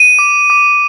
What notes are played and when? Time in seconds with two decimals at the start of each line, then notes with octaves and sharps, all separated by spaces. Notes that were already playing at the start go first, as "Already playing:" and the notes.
Already playing: D#7
0.19 D6
0.50 D6